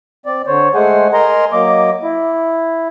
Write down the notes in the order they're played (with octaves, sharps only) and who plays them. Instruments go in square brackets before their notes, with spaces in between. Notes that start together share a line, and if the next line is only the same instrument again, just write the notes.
[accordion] C4 D5
D3 C5 C#5
G#3 A3 G#4 C5 F#5 G#5
A#4 D#5 G#5 A#5 C6
F#3 A#3 D#5 D6
E4